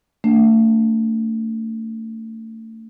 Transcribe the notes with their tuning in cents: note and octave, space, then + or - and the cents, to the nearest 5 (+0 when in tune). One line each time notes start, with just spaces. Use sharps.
A3 +30 D4 -25